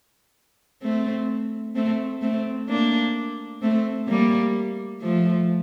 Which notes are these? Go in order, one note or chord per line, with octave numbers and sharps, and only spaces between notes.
A3 C4
A3 C4
A3 C4
A#3 D4
A3 C4
G3 A#3
F3 A3